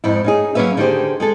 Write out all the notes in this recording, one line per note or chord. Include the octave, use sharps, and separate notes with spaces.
F2 G#2 E4
C#4 D#4 G#4
F#3 A#3 C4 C#4 B4 E5
D3 D#3 G4 G#4 C5
G#3 G#4 A4